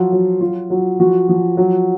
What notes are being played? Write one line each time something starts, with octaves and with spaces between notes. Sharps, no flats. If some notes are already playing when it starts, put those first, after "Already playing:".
Already playing: F3 F#3 F4
F#3
F#3 F4
F#3
F3 F#4
F3
F#3